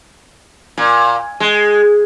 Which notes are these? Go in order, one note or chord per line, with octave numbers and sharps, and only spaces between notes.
A#2
G#3